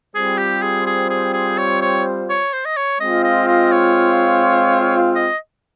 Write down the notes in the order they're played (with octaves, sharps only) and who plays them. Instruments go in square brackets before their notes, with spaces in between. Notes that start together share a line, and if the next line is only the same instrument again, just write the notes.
[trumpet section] G3 C4 F4 C5 [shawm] G#4
[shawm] G4
G#4
G#4
G#4
G#4
C#5
C#5
C#5
C5
D#5
C#5
[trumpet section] G#3 C4 F4 [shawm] D#5
[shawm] D#5
D#5
C#5
D#5